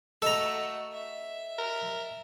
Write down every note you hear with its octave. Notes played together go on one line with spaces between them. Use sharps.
A3 F#4 A4 D#5 A#5 E6
E5
A#4